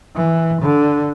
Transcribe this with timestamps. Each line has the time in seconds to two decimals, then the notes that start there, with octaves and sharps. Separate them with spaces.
0.16 E3
0.62 D3